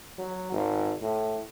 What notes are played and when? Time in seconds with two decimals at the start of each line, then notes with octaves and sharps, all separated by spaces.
0.18 F#3
0.52 G#1
1.01 A2